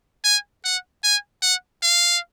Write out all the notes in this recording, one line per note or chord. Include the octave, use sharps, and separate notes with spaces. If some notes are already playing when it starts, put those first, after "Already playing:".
G#5
F#5
G#5
F#5
F5